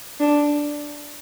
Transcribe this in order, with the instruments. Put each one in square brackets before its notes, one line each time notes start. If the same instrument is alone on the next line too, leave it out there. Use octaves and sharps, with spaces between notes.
[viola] D4